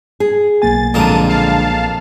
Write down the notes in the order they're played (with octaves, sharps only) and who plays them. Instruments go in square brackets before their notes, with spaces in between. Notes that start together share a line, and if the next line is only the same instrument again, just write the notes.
[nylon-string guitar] G#4
[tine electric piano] B1 A#3 G#5 [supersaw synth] A6
[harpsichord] F2 A#2 A#4 [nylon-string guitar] D3 G#3 [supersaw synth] A5 D#7
[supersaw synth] F5 A5